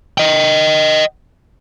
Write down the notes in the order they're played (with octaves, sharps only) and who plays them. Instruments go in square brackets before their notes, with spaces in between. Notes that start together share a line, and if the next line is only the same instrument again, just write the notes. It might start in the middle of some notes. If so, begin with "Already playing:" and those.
[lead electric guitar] D#5 G5